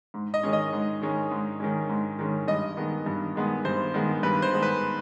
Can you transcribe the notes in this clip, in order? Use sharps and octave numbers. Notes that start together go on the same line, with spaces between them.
G#2
D#5
D#3 G#3 C#4
D#5
G#2
D#3 G#3 C#4
G#2
D#3 G#3 C#4
G#2
D#3 G#3 C#4
G2 D#5
D#3 G#3 B3
G2
D#3 G#3 B3
G2 C5
D#3 G#3 B3
G2 B4
C5
D#3 G#3 B3
B4